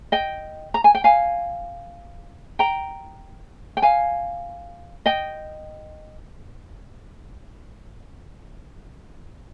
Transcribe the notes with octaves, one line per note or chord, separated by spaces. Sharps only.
D#5 G5
A#5
G#5
G5
F5 G#5
G5 A#5
G5
F5 G#5
D#5 G5